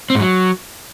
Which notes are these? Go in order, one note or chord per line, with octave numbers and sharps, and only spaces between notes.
C4
G#2
F#3